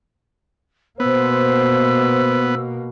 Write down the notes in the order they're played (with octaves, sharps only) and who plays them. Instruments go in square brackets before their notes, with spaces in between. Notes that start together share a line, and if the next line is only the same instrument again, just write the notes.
[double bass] B2 A#3 [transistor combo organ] B3 [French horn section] C5 [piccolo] E6